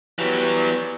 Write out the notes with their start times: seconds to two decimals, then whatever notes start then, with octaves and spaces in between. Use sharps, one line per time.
0.19 E3 F#3 G3 B3